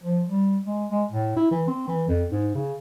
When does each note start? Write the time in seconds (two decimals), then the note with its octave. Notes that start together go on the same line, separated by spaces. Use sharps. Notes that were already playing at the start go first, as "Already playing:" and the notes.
0.03 F3
0.28 G3
0.65 G#3
0.91 G#3
1.11 A2
1.37 E4
1.51 E3
1.67 C4
1.88 E3
2.08 F2
2.31 G#2
2.55 C#3